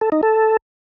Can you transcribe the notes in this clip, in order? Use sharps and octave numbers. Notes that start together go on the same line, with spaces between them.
A4
D#4
A4